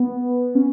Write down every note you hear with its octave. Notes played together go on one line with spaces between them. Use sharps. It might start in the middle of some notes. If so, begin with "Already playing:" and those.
Already playing: B3
C#4